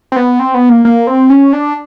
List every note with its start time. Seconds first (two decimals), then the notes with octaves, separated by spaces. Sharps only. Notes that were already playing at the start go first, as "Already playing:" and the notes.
0.12 C4
0.16 B3
0.39 C4
0.54 B3
0.69 A#3
0.85 A#3
1.07 C4
1.30 C#4
1.53 D4